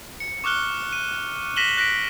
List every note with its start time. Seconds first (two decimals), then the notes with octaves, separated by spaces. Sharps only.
0.20 C#7
0.44 C#6 D6 F6 F#6 G7
0.93 D#7
1.56 A#6 B6 D#7 E7 F#7 G7
1.78 F#6 A#6 B6 D7